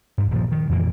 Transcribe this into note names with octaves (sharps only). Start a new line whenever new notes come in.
G2
D#1 A#2 F3
D#3
F2 A#2 E3 A#3